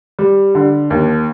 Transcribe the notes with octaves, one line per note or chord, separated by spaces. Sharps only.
G3
D3
D#2